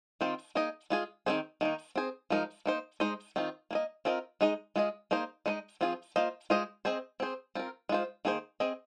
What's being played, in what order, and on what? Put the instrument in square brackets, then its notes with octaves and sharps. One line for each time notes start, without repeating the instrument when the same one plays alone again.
[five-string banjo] D#3 C4 F4 C5
A#3 D#4 G#4 D#5
G#3 F4 G#4
D#3 G#3 C4 G#4 C5
D#3 A#3 D#4
C4 G#4 C5
F3 G#3 D#4 A#4
A#3 D#4 C5
G#3 D#4 C5 D#5
D#3 C4 F4
A#3 G#4 D#5
C4 F4 A#4 D#5
G#3 D#4 G#4 D#5
G#3 F4 G#4 D#5
A#3 D#4 G#4 C5 D#5
G#3 D#4 C5 D#5
F3 C4 F4 G#4
A#3 F4 C5 D#5
G#3 F4 G#4 C5 D#5
C4 G#4 C5 D#5
C4 G#4 C5
C4 F4 A#4
G#3 F4 C5
D#3 A#3 G#4 C5
C4 G#4 D#5